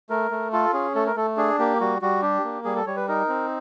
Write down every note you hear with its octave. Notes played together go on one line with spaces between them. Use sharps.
A3 A#4
A3
F4 A4
C#4 G#4
A3 A4
A#4
A3 A4
D4 G#4
A#3 G4
G3 F#4
G3 F#4
D4 G4
A#3
G3 G#4
A4
G3 C#5
B4
D#4 A#4
C4